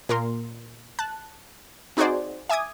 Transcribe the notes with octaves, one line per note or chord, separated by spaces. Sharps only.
A#2 A#4 C6
A5 F#6
C4 D#4 F#4 G#4 C5 D5
E5 G#5 D6 D#6 G#6